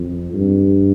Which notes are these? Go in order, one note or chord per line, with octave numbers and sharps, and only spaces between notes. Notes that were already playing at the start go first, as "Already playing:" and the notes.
Already playing: F2
G2